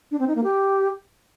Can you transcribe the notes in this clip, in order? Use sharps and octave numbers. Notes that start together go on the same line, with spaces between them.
D4
C4
D#4
A#3
G4